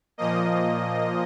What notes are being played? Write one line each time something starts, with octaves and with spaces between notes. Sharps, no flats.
A#2 F3 A#3 D#5